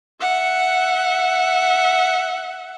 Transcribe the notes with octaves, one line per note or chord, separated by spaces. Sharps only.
E5 F#5